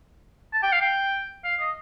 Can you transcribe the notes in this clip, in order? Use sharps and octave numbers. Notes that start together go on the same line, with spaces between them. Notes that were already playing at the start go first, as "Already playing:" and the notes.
A5
G5
F5
G5
F5
D#5